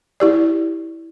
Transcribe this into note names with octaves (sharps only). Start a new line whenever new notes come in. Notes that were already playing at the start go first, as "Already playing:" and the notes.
E4 G4 D5